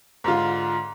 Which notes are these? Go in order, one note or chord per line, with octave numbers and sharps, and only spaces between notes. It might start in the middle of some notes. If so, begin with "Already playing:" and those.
G#2 D3 F4